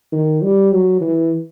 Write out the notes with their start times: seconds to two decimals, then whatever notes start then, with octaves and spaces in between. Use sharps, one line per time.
0.12 D#3
0.42 G3
0.72 F#3
1.01 E3